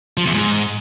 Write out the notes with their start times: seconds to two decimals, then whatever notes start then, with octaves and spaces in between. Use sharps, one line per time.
0.17 F3
0.26 E2
0.34 G#2